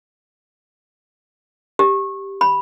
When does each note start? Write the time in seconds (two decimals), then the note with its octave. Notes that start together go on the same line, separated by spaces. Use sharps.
1.79 G4
2.41 B5